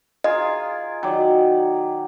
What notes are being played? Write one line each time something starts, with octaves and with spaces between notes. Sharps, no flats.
F4 G#4 A#4 D#5
D#3 F#3 D5